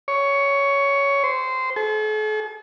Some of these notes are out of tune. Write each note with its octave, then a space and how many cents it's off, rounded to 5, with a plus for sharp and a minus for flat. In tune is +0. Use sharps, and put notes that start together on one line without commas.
C#5 +10
C5 -15
A4 -45